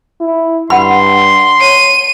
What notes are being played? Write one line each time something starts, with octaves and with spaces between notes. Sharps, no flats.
E4
G2 F#5 B5 C6
C#5 D#7